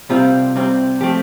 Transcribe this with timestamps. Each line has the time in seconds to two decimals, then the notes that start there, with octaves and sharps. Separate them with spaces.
0.09 C2 C3 G3 C4 F4
0.55 C2 C3 G3 C4
1.01 F3 A3 C4 G4